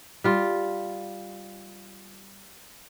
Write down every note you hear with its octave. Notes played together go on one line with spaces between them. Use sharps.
G3 F4